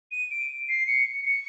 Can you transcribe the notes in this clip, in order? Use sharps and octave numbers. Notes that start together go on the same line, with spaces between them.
D#7
D7
C7
C#7
C#7